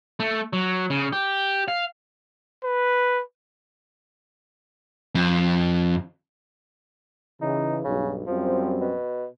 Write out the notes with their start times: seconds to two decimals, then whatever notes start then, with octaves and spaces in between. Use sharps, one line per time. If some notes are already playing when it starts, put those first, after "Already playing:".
0.20 A3
0.53 F#3
0.90 C#3
1.13 G4
1.68 F5
2.64 B4
5.15 F2
7.41 C#3 E3 D#4
7.84 B1 G2 C#3
8.27 F#2 F3 G3 C4
8.81 B2